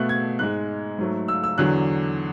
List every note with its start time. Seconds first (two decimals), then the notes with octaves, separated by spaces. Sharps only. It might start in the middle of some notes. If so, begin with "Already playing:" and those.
Already playing: B2 A3 F#6
0.09 G#6
0.39 G#2 G#3 F#6
0.99 G#2 F#3 A3
1.28 E6
1.44 E6
1.58 E2 D3 F#3 F#6